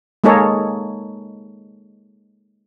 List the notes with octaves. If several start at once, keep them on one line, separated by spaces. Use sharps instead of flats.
G#3 A#3 D#4 G#4 A4 C#5